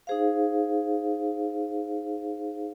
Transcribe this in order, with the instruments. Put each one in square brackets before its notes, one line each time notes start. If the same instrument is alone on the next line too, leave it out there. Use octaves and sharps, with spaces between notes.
[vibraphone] D#4 G#4 C5 F5